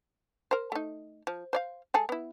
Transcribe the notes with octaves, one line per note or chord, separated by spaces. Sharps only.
A#4 C5
A3 D#4
F3
C5 D5 F5
G#3 G#4 A4
B3 E4